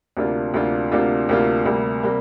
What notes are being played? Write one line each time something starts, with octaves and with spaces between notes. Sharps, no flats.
D2 C3 A#3 D4 F4
D2 C3 A#3 D4 F4
D2 C3 A#3 D4 F4
D2 C3 A#3 D4 F4
D2 C3 G3 A#3
C3 G3 A#3